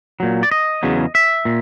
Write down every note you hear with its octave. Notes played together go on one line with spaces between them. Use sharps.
A#2 F#3
D5
D#5
E2 C#3 F#3
E5
A#2